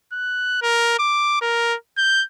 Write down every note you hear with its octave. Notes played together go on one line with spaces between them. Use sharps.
F#6
A#4
D6
A#4
G6